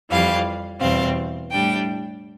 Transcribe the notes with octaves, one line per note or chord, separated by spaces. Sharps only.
F2 E3 G3 F5
E2 B2 G3 C4 F5
A2 G3 D4 G5